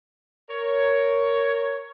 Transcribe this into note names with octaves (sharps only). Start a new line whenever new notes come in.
A#4 C#5